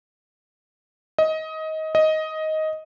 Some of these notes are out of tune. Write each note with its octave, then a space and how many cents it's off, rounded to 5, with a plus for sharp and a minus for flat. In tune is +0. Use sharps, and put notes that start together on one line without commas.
D#5 +20
D#5 +10